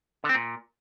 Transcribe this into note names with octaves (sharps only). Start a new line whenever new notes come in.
D3
C4
A#2